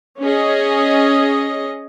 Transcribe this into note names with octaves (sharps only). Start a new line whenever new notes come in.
C#4 G#4 D#5